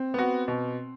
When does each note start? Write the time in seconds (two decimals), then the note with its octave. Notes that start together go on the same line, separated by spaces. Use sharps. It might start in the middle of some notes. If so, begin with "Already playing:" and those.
Already playing: C4
0.14 B3 F#4
0.48 B2